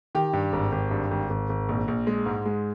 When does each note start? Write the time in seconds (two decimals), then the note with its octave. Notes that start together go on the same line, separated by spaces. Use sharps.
0.15 D#3 G4
0.33 G2
0.53 G#1
0.72 G#1
0.91 G2
1.11 G#1
1.30 G#1
1.49 G#1
1.69 A#1
1.88 A#1
2.07 G#3
2.26 G#2
2.46 G#3